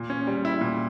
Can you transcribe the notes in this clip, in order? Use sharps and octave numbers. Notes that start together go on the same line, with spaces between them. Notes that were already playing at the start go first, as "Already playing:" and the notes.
Already playing: A#2
C#4
G3
E4
A#2